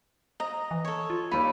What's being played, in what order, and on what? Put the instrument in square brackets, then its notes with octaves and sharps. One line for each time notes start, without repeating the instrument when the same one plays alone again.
[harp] D#5 [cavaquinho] A#5
[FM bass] E3
[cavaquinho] A4 C#5
[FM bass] F4
[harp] D#2 B5 [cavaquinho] D#4 D5